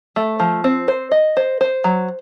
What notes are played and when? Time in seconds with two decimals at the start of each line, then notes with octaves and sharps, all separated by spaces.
0.16 A3
0.40 F3
0.64 C4
0.88 C5
1.11 D#5
1.37 C5
1.61 C5
1.84 F#3